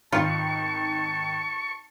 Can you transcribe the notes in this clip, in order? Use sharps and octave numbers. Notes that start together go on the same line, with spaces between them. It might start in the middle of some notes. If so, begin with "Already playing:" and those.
G#1 D#3 F4 A5 C#6